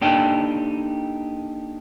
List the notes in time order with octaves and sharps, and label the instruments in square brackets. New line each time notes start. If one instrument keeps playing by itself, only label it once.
[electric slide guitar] A#3 D4 D#4 G4 A4 G5